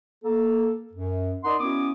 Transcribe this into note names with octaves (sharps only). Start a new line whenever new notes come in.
A#3 A4
F#2
D#4 A#4 D5 D#5 F#5 C6
B3 C#4 E4 F#4 D6 D#6